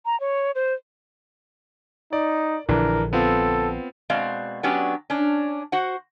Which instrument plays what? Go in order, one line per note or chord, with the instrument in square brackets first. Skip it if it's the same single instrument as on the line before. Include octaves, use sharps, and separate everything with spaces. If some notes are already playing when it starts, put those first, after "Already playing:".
[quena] A#5
C#5
C5
[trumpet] D#4 [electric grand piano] D5
[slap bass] A#1 D3 [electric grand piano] E3 D4 [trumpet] A#4
[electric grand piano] B3 C4 F4 [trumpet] A4
[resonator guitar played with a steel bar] B2 G#3 C4 F#4 D5 F5
F#3 B3 C#4 D4 G4
C#4 D4
F#4 C5 F#5